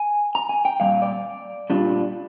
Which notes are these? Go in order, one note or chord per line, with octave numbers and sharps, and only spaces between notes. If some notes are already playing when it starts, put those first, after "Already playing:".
Already playing: G#5
A#5
G#5
G5
A#2 G3 F5
D5
A#2 G3 D4 F4